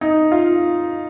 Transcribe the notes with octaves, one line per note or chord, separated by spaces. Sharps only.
D#4
F4